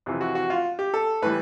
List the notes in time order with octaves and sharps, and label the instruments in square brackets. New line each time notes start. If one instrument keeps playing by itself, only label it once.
[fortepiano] F2 C3 E3
F#4
F#4
F4
G4
A4
A2 E3 G3 B4